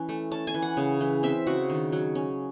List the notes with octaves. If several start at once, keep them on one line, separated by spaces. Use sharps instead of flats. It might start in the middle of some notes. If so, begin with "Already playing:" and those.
Already playing: E3 C#4
A3
C#4 A5
G#5
E3
F#5
C#3
E3
C4 E5
C#3 F#4
D#3
F#3
C#4